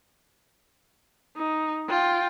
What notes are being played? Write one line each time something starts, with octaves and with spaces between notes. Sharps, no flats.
D#4
F4 G5